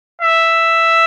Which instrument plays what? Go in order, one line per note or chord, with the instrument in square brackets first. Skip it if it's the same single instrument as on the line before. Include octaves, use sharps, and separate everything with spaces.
[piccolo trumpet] E5